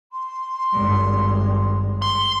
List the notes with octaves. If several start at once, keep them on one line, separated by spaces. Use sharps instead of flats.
C6
G#1 G2
C6